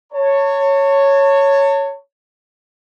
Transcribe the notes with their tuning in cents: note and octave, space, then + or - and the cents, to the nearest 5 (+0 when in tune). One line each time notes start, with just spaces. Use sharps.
C#5 +0 A5 +40